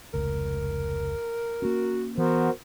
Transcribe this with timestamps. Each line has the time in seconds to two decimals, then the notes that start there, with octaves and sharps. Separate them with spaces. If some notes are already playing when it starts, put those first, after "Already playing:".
0.14 F1 C#2 A#4
1.62 A#3 C#4 F#4
2.18 E3 B3 F#4 A#4 C5